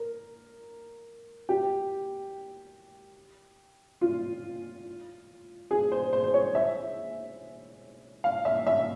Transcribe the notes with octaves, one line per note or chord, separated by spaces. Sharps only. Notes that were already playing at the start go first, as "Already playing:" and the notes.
Already playing: A#4
G4
F4
G#4
C5
C5
C5
C#5
E5
F5
E5
E5